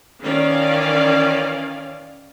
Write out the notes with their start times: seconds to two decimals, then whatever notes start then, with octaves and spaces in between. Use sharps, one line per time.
0.20 D#3 E3 C#4 D5 F5